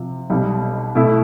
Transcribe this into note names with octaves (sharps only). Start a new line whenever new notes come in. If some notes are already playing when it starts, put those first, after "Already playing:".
Already playing: C3 F3 F4
B1 B2 G3
B2 A3 E4